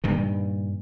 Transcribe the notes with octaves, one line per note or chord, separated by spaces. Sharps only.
G2 A#2 D#3